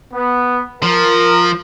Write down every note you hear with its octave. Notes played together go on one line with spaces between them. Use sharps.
B3
F3 A#4